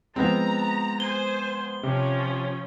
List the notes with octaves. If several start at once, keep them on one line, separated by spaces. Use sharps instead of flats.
F3 G#3 B3 C4 A#5
C5 G#5 G7
C3 F3 C#4